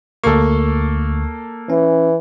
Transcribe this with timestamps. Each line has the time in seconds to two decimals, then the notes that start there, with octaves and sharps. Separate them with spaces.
0.24 D2 A#3 A4 C#6
1.70 E3 C#4